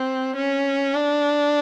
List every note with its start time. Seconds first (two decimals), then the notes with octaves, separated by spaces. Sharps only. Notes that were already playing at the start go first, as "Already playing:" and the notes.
Already playing: C4
0.36 C#4
0.94 D4